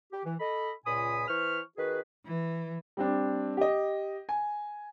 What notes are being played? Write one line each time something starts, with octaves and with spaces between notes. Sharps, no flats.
G4
E3
A4 D#5 B5
C#2 A#2 G#5 B5 D#6
E3 B4 C5 C#6 F6
D#3 F#4 G#4 B4
E3
G3 C4 D4
G4 D#5
G#5